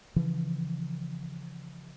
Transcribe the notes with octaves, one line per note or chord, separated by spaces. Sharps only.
C#3 E3 F3